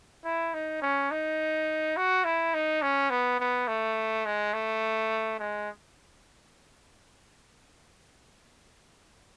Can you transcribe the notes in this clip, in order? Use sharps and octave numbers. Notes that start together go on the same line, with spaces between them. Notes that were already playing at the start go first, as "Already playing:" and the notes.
E4
D#4
C#4
D#4
F#4
E4
D#4
C#4
B3
B3
A3
G#3
A3
G#3